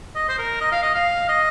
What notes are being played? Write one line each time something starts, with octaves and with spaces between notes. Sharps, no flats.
D#5
C5
A#4
D#5
F5
D#5
F5
D#5